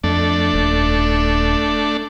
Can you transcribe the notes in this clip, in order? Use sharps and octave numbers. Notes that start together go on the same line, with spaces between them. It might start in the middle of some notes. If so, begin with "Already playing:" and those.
F2 A3 D4
D#1